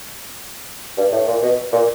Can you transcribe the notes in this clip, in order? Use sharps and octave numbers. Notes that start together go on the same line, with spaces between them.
G2
A2
A#2
B2
A#2